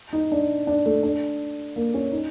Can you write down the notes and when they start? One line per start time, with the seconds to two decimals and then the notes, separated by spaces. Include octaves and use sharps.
0.13 D#4
0.32 D4
0.67 D4
0.86 A3
1.03 D4
1.76 A#3
1.94 C#4
2.12 D#4